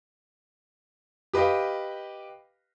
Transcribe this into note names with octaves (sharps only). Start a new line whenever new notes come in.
G4 B4 D#5 F5 G5